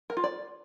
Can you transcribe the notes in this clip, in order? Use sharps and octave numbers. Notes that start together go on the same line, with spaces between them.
A#4
F4
D5